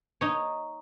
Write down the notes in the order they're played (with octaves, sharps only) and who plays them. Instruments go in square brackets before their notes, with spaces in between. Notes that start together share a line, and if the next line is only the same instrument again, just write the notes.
[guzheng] D#4 C#5